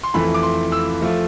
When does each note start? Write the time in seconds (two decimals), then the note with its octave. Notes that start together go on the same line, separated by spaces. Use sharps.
0.03 C6
0.14 F2 E3 A3 B5
0.34 D6
0.43 C6
0.72 E6
1.02 F3 A3